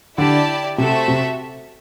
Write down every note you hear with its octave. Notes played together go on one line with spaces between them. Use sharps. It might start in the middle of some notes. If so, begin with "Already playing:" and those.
D3 E4 G4 D5 A5
C3 A3 C4 F#4 A4 E5
C3